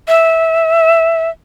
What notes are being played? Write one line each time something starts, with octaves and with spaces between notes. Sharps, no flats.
E5